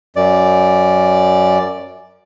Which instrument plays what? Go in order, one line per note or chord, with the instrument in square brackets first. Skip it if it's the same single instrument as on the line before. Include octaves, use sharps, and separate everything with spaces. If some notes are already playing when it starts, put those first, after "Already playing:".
[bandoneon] F#2 D5